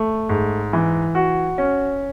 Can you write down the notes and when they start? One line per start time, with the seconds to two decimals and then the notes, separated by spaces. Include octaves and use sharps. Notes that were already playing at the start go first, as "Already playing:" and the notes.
Already playing: A3
0.29 G#2
0.73 E3
1.15 F#4
1.58 C#4